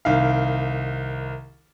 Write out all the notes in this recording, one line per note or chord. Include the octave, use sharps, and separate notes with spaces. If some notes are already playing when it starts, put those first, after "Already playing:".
C2 D#3 F5